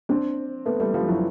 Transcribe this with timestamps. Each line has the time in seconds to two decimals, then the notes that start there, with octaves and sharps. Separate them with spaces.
0.09 C4 D4
0.66 A3 B3
0.80 G3 A3
0.94 F3 G3
1.08 E3 F#3